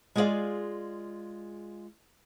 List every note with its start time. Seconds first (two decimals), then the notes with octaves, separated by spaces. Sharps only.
0.15 G#3 F4 G#4 A4 D5 F5